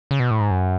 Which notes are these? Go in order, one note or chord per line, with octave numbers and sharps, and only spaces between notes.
C#3
B2
A2
G#2
F#2